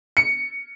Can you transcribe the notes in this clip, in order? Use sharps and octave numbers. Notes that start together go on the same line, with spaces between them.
C#7